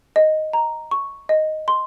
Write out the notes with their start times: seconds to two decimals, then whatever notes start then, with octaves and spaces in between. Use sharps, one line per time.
0.16 D#5
0.53 A#5
0.91 C#6
1.29 D#5
1.68 C6